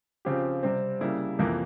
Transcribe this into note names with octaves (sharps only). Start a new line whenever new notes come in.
C#3 F3 C4 G4
C3 G3 C4
C#3 G3 A#3 E4
F2 C3 E3 A#3